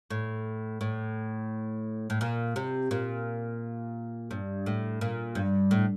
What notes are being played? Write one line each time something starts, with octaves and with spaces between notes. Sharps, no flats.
A2
A2
A2
A#2
C3
A#2
G2
A2
A#2
G2
A2